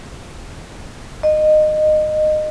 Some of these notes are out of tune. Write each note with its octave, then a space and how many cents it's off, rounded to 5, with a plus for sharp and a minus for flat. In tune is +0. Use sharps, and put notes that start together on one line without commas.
D#5 -20